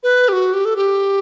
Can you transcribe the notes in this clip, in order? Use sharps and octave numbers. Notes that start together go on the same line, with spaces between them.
B4
G4
F#4
G4
A4
G4